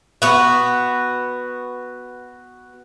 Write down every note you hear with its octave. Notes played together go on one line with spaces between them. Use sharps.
B3 F#4